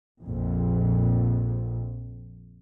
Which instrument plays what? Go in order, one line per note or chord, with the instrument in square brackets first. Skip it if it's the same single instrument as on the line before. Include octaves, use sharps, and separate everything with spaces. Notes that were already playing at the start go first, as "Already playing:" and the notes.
[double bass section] A#1 F2